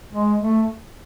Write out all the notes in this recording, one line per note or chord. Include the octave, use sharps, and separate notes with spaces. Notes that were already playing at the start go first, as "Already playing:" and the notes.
G#3
A3